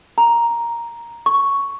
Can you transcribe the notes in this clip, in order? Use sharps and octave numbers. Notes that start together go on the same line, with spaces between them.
A#5
C#6